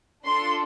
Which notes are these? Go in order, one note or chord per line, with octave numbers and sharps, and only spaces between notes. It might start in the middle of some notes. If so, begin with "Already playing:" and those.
D4 F4 A4 C6